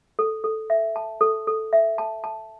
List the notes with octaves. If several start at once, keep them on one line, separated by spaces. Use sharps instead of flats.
A4
A4
E5
A5
A4
A4
E5
A5
A5